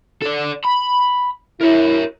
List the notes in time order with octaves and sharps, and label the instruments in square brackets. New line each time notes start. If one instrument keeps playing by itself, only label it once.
[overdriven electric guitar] A4 D5
B5
[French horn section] E4 [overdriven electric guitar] A#4 C#5